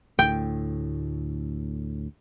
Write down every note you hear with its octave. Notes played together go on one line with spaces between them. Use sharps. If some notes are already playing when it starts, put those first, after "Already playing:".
D2 A2 G5